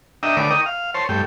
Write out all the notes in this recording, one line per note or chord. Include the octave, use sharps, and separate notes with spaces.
D4 D#5 E5 G5 A#5
D3 A3 B4 C#5 D5 D6
D#5 G5 A#5 C#6 D#6
F5
C5 C#5 A5 C6
G2 A3 G5